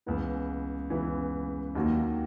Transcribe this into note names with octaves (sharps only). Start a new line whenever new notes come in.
C#2 C#3 E3 B3 E4
C#2 C#3 E3 B3 E4
D#2 D#3 F#3 A#3